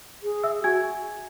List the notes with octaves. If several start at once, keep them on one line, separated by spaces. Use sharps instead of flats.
G#4
E5 E6
F#4 G#5 G#6